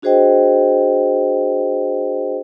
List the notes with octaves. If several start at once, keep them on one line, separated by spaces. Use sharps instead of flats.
D4 F#4 G#4 C5 D#5 G5